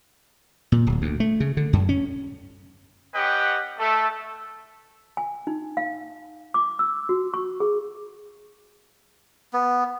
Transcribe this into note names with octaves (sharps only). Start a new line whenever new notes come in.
A#2
D1
D2
A3
C#3
D3
F#2
C#4
C#4 G4 B4 D#5 F#5 G5
A3 A4
G#5
D#4
F5
D6
E6
F#4
C#6
G#4
B3